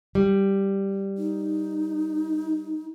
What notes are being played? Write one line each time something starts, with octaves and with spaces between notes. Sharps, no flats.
G3
D#4